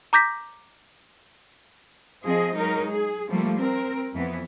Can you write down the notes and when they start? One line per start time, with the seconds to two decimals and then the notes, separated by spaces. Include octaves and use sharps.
0.13 A#5 D6 G6 A#6 B6
2.25 F3 C4 G#4 D#5
2.56 F#3 G#3 D#4 A#4
2.90 G#4
3.29 F3 G3 A3 A#3
3.60 C4 A#4
4.14 F2 E3 B3